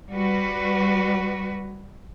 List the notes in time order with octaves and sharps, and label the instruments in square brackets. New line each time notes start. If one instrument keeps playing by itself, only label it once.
[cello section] G3 F#4 B4